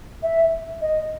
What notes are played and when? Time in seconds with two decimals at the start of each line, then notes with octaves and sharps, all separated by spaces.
0.23 E5
0.82 D#5